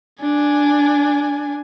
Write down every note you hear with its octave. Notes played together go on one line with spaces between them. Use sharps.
D4 G#5